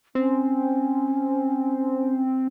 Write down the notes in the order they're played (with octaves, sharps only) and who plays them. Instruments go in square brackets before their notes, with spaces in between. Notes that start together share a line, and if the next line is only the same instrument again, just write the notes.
[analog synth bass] C4 [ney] C#4